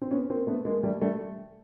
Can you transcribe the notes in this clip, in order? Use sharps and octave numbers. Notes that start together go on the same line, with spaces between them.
C4
B3 C#4
A#3 C4
A3 B3
G#3 A#3
G3 A3
G3 A3